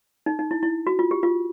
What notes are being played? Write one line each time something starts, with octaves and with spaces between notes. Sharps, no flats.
D#4
D#4
E4
E4
F#4
F4
G4
F4